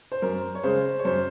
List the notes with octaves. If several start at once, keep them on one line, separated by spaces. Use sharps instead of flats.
C5
F#2 A#4
C#5
C#3 G#3 C5
C#5
F#2 C5